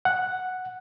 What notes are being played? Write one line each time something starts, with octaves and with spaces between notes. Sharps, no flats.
F#5